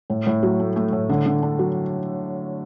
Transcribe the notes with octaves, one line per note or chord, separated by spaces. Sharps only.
A2
A2
F#3
A3
A3
A2
D3
D3
D4
F#3